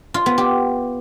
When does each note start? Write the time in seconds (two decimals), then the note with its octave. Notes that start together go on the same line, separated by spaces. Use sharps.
0.14 F4
0.26 B3
0.38 G4